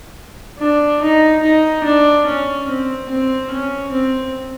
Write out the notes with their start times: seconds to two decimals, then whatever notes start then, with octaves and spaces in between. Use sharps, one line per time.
0.59 D4
1.02 D#4
1.43 D#4
1.84 D4
2.26 C#4
2.68 C4
3.09 C4
3.51 C#4
3.91 C4